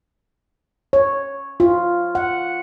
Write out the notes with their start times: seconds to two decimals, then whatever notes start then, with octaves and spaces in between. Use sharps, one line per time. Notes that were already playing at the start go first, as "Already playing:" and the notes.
0.93 C#5
1.60 F4
2.15 F#5